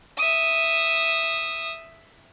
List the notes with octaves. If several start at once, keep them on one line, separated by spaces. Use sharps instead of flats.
E5 D#6